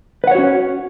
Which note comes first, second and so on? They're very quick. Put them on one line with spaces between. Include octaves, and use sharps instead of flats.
B4 F#5 C#5 F#4 C#4